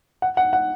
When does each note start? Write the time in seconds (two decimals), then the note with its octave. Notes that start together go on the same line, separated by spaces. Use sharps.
0.22 F#5
0.37 F#5
0.53 F#5